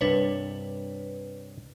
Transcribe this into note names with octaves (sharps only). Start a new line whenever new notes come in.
C2 G2 D4 B4 C#5